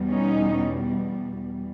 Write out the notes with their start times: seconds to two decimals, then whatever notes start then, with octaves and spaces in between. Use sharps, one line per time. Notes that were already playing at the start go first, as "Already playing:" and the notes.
Already playing: E2 B2 G3
0.11 C#4 D#4